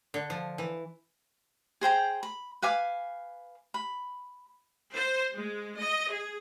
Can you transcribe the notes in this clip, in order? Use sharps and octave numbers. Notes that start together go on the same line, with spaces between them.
D3
F3
E3
G#4 C5 G5 A#5
B5
B4 F5 G#5 D6
B5
C5
G#3
D#5
G#4